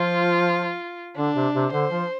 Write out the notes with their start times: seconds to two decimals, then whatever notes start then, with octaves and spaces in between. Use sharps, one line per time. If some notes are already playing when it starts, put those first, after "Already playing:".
Already playing: F3 F4
1.16 D3 D4
1.35 C3
1.54 C3
1.72 D3 C5
1.91 F3